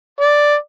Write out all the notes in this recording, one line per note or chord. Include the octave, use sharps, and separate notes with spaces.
D5